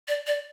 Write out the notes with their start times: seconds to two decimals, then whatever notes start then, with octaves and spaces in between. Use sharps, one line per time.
0.08 D5
0.27 D5